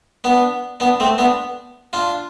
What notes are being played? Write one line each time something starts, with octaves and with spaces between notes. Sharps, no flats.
B3 D4
B3 D4
A3 C4
B3 D4
D4 F4